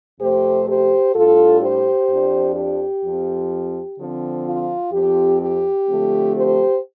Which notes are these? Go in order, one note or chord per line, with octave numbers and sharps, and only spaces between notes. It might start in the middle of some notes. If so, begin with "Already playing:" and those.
F2 C3 A3 G4 C5
G4 C5
A2 G3 D4 F4 A4
G4 C5
F2 F3 D4
G4
F2 F3 C4
D3 F3 C4
F4
F2 F3 C4 G4
G4
D3 F3 A3 C4
G4 C5